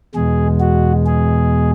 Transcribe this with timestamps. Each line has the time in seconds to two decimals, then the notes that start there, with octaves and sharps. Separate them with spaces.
0.14 E2 B2 G#3 G#4
0.60 F#4
1.06 G#4